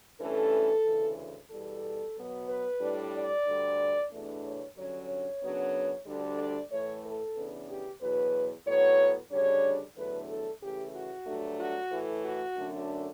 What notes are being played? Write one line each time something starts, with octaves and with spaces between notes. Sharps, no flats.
G2 E3 A3 C#4 A4
D2 C#3 E3
E2 B2 G3 A4
B2 F#3 B3
B4
A2 G3 D4
D5
D2 D3 G3
E2 B2 A3 D4
C#5
G2 D3 F#3 C#4 C#5
C#5
F#2 C#3 F#3 B3 D4
D2 D3 G3 D4
D5
A2 E3 A3 C#5
A4
C#3 E3 B3 D4
G4
E2 B2 F#3 B4
A2 F#3 B3 C#5
D2 C#3 G3 D4 C#5
E2 D3 F#3 A3 D4 B4
A4
C#3 E3 A3 G4
F#4
G2 F#3 A3 D4
F#4
A2 E3 A3
F#4
F#2 D3 F#3 A3 D4